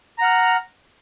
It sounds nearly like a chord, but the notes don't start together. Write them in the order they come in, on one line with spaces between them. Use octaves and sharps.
A#5 F#5 F6